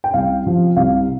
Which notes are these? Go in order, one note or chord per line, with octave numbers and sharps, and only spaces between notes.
G5
C2 F5
C3 F3
C2 F5